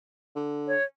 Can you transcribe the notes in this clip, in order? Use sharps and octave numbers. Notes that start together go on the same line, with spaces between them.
D3
C#5